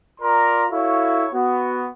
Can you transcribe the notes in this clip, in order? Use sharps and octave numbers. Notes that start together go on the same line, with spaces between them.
F4 A#4 D5 A#5 C6
E4 F#4 A4 C#5 F5
B3 F#4